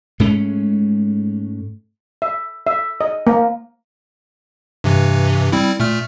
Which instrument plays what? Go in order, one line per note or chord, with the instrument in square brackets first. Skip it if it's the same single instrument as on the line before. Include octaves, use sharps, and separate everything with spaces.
[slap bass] G#2 G#3 A3 C#4
[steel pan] E5
E5
D#5
A#3
[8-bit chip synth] G2 C3 E3
G3 C4 E4
A#2 A3 F6